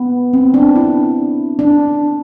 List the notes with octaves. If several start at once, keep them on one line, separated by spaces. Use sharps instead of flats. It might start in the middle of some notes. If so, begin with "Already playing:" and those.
Already playing: B3
C4
D4
E4
D4